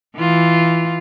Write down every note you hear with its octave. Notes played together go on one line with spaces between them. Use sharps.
E3 F4